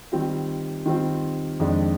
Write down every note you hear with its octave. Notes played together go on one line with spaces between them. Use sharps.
D#3 G3 C4 F4
D#3 G3 C4 F4
F2 D#3 G#3 D4